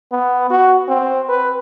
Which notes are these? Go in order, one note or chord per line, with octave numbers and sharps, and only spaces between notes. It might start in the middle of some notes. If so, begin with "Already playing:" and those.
B3
F#4
C4
B4